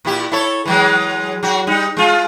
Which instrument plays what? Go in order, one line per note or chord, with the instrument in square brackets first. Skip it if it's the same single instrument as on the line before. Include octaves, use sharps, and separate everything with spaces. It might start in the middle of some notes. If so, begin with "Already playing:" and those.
[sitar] A#2 E4 G4
E4 A4 C#5
E3 F#3 G#3
F#3 F#4
G3 D#4
G#3 F4